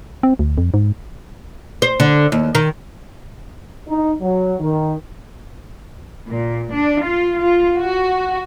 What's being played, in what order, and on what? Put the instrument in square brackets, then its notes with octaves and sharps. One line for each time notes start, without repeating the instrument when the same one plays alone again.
[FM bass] C4
D2
F2
G#2
[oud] C5
D3
D#2
D#3
[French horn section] D#4
F#3
D#3
[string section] A#2
D4
F4
F4
F#4